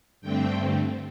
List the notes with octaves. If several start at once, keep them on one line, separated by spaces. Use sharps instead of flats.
G2 D3 A3 C4 G5